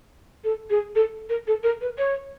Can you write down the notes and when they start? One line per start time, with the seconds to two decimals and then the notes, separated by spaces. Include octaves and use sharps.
0.43 A4
0.69 G#4
0.95 A4
1.29 A#4
1.47 A4
1.63 A#4
1.80 B4
1.97 C#5